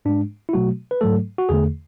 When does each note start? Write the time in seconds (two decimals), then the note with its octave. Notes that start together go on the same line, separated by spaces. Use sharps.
0.05 G#2 G#3 D4
0.49 E4
0.53 B2 F#3 A3 F#4
0.91 B4
1.01 G#2 F#3 A3 A4
1.38 F#4
1.49 E2 D3 A3 G#4